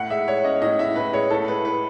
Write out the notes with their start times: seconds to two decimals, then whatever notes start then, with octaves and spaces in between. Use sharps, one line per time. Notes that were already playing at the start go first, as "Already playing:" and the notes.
Already playing: A2 E4 F#5
0.10 G#3 E5
0.27 G#3 C#5
0.44 C#4 D#5
0.62 A2 D#5
0.79 A2 E5
0.96 A2 B4
1.13 G#3 C#5
1.30 A2 A4
1.48 G#3 B4
1.65 E4 B4